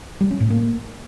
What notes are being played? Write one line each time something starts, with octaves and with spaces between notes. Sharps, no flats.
G3
C#4
A2
A#3